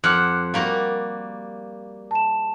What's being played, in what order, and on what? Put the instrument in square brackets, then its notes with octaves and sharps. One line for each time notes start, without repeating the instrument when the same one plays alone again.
[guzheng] F2 F#5 [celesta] D6 F6 F#6
[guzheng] G3 A#3 F#4 [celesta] F5
[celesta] A5 E7